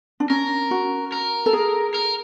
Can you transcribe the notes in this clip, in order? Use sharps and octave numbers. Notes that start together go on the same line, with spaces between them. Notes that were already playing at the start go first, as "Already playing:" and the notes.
D4
C#4 A#4
F#4
A#4
A4
G#4
A#4